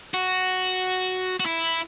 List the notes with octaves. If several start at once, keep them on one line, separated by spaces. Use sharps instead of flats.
F#4
F#4
E4